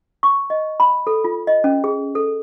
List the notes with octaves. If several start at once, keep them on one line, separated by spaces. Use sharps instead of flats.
C#6
D#5
B5
A4
F4
D#5
C#4
G#4
A4